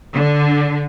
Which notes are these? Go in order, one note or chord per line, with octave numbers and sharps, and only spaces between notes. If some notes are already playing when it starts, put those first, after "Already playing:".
D3